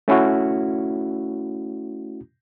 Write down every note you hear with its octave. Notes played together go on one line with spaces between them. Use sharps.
A3 C#4 E4 F#4